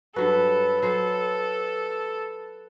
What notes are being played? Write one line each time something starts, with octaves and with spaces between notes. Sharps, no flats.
G2 F#3 F#4 A4 B4
F#3 A4 C5